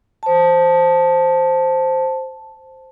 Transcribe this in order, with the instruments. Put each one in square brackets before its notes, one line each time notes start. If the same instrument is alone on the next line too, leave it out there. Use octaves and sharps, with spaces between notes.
[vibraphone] C5 A5